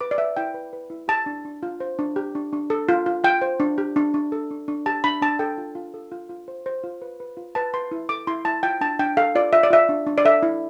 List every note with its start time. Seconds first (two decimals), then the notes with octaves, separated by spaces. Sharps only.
0.01 B4 D6
0.11 D5
0.18 B4 E5
0.36 E4 G5
0.54 B4
0.73 B4
0.90 E4
1.08 G4 A5
1.26 D4
1.45 D4
1.63 F4
1.80 C5
1.99 D4
2.16 G4
2.35 D4
2.53 D4
2.70 A4
2.89 F4
3.06 F4
3.24 F4 G5
3.42 C5
3.60 D4
3.78 G4
3.96 D4
4.14 D4
4.32 A4
4.51 D4
4.68 D4
4.86 G4 A5
5.04 D4 B5
5.22 D4 A5
5.39 A4 G5
5.58 F4
5.75 F4
5.94 A4
6.12 F4
6.30 F4
6.48 C5
6.66 C5
6.83 F4
7.02 B4
7.20 B4
7.37 F4
7.55 B4 A5
7.74 B4 C6
7.91 E4
8.09 A4 D6
8.27 E4 C6
8.45 E4 A5
8.63 F4 G5
8.81 D4 A5
8.99 D4 G5
9.17 A4 F5
9.35 F4 D5
9.53 F4 E5
9.63 D5
9.71 F4 E5
9.89 D4
10.07 D4
10.18 D5
10.25 A4 E5
10.43 E4